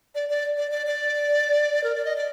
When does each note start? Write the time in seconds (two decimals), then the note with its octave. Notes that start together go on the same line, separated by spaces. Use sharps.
0.15 D5
0.29 D5
0.57 D5
0.71 D5
0.86 D5
1.84 A#4
1.95 D5
2.05 D#5
2.16 D5